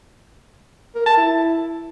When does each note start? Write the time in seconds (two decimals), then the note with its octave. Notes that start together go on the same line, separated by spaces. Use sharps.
0.95 A#4
1.06 A5
1.17 E4